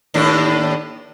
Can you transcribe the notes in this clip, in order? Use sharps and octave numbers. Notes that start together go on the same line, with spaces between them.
D#2 A2 D4